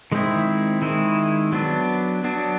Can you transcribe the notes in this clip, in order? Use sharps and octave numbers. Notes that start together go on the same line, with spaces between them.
D#3 G#3 C4 E4
D#3 G#3 C4 E4
F#3 B3 D4
F#3 B3 D4